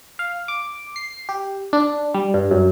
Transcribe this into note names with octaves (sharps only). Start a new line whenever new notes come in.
F5
D6
C7
G4
D4
G3
G2
F#2